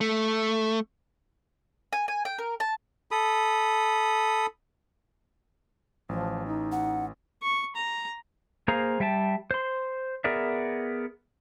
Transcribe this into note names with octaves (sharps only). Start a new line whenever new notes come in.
A3
G#5
G#5
G5
A#4
A5
A4 B5 D#6
A1 F3
D#4
F#5
C#6
A#5
A#3 G#4 C5 F5 A#5
G3 E5 G5 A5
C5 C6
B3 G#4 A#4 D5 E5